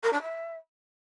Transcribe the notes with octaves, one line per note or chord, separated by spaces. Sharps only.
A#4
D4
E5